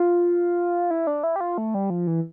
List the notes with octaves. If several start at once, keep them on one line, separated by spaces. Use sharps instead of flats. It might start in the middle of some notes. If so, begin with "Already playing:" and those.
Already playing: F4
E4
D4
E4
G4
F4
A3
G3
F3
E3